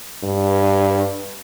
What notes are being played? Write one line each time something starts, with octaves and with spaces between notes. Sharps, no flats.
G2